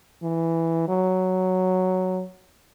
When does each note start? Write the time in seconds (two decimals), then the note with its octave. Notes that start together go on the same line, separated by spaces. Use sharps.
0.23 E3
0.89 F#3